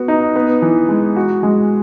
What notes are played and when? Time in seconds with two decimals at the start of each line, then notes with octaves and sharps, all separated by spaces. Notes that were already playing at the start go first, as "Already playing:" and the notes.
Already playing: B3 F#4
0.08 D#4
0.36 B3
0.62 E3
0.89 G#3
1.16 F#4
1.43 G#3